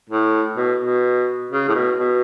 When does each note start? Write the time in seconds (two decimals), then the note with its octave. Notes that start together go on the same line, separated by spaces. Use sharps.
0.10 A2
0.57 B2
0.80 B2
1.51 C#3
1.68 A2
1.75 B2
1.99 B2